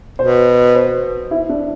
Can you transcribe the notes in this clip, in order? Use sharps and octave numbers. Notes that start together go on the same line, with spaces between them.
B2 C5
C5
E4
D4